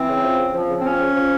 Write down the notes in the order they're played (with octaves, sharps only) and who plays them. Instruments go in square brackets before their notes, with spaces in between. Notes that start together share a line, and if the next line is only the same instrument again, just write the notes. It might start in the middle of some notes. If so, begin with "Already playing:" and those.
Already playing: [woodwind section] E3 C4
C#3
F3
C#3
F3
C#3
C4
F3 C#4
C#3
F3